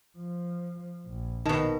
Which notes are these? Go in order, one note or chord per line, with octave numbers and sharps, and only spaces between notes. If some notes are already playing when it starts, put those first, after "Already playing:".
F3
A#1
B2 D#3 D#4 A5